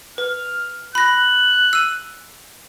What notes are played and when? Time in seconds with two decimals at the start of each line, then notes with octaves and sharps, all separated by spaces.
0.18 B4 F6
0.95 B5 F#6 A#6
1.73 E6 D#7